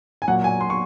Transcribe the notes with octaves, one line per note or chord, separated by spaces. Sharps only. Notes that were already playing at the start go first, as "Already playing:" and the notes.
G#5
A#2 F#3 A#3 F#5
G#5
C6
C#6